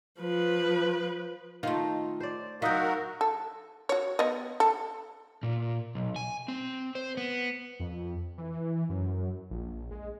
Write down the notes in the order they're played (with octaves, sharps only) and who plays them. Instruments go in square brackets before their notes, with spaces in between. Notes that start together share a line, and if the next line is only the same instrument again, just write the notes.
[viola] F3 B4
[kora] D#3 A3 [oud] D#4 F4
[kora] C5 D5
[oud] F#3 D#4 [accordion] F#4 A#4 [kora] E5 [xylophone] F5 D#6 G6
[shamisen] A4
F#4 C#5
B3 D#5
A4
[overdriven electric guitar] A#2
B1
G#5
C4
C5
B3
[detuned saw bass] F2
E3
F#2
A#1
G#3